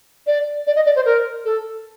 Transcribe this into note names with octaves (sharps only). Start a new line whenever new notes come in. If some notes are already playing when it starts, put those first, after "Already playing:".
D5
D5
D#5
D5
C5
A#4
A4